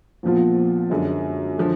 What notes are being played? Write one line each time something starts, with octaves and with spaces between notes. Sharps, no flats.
A#1 A#2 F3 B3 F4
F#2 D3 G#3
D3 F3